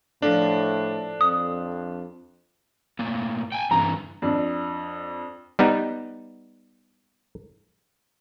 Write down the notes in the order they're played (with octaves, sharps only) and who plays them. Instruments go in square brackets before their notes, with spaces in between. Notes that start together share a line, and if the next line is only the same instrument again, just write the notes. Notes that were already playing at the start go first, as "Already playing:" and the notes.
[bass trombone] A2 [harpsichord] D3 F3 [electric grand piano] D4
[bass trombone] F2 [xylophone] D#6
[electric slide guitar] A2 A#3
G5 G#5
[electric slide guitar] G2 D3 E3 [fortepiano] A#5
[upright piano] F2 D4
[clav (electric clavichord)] G3 B3 D#4